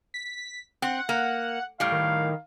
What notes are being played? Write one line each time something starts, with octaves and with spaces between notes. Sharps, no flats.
B6
C4 F#5
A#3
A2 G3 F5
D#3